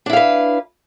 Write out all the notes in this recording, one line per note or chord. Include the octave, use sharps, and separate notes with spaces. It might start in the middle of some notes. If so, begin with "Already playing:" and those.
D4 E4 B4 F5